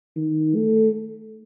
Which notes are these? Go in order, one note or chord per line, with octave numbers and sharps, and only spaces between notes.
D#3
A3